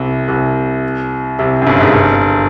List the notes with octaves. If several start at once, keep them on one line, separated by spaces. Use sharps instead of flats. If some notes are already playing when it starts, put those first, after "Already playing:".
Already playing: C2 C3
C2 C3
C2 C3
F#2
G1 G2
G#1 G#2
G1 G2